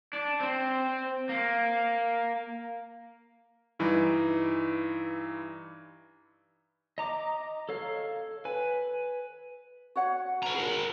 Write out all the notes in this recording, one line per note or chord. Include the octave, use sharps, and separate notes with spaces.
D4
C4
A#3
G2 E3 D#4
D#5 A#5 D6
A4 C#5 F5
B4 G#5
F#4 C#5 F#5
B4 A#5
G#4 A#4